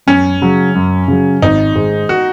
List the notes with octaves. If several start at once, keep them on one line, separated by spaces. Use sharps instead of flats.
F#2 C#4
C#3 F#3
F#2
C#3 F#3
G#1 D#4
G#2 D#3 G#3
F#4